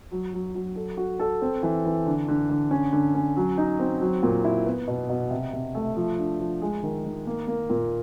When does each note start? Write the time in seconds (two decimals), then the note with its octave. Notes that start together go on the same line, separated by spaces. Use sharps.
0.12 F#3
0.33 F#3
0.55 F#3
0.76 A4
0.97 F#4
1.19 A4
1.42 C4
1.63 E3
1.85 E3
2.06 D3
2.28 D3
2.50 D3
2.71 C#4
2.93 D3
3.15 C#4
3.37 F#3
3.58 D#4
3.79 C4
4.01 F#3
4.23 A#2
4.44 E4
4.66 B3
4.88 B2
5.10 B2
5.31 C3
5.53 C3
5.75 A3
5.96 F3
6.18 D4
6.39 F3
6.61 G#3
6.83 D#3
7.05 D#3
7.27 A#3
7.48 A#3
7.70 A#2